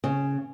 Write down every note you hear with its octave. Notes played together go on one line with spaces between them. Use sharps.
C#3